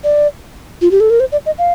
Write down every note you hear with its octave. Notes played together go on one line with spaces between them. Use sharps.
D5
F4
G4
A4
A#4
C5
D5
D#5
F5